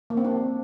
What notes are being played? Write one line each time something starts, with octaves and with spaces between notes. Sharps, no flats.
A#3
C4
D4